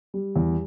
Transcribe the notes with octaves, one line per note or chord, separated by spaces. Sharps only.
G3
E2